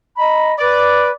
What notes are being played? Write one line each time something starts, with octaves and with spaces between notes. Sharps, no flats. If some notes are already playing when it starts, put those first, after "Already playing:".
D#5 A#5 B5
B4 D5